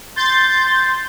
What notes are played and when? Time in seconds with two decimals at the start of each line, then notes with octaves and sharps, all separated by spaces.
0.16 C6 G6 A6